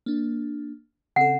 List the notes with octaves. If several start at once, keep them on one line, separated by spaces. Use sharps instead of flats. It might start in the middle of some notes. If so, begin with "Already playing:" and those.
A#3 D4
C#3 C4 A4 F#5